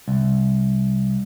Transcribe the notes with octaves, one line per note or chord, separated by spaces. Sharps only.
C2